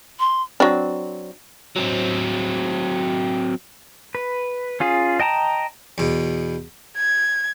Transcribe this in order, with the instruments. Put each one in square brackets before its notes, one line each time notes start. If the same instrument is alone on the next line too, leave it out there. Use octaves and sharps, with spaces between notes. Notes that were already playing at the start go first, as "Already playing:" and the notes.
[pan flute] C6
[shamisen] F#3 C4 D4
[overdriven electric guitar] F#3 C4
[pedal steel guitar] B4
C#4 F4 G#4
D#5 G5 A5 A#5
[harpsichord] E2 B2
[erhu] G#6